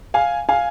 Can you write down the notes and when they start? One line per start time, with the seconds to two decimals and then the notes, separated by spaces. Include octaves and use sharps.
0.14 F5 G#5
0.49 F5 G#5